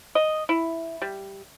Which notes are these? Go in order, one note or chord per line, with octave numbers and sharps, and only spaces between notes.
D#5
E4
G3